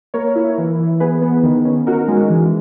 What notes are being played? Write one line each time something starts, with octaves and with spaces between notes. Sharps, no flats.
A#3 A#4 C#5
E4
E3
E3
B3 G#4 B4
B3
D#3
C#4
D#4 F#4 A#4
G#3
E3